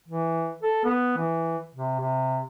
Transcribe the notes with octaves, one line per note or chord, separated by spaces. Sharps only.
E3
A4
B3
E3
C3
C3